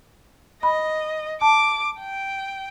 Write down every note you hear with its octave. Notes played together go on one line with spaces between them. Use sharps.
D#5 B5
A5 D6
G5